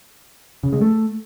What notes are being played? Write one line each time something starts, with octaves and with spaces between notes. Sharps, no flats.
C#3
G#3
A3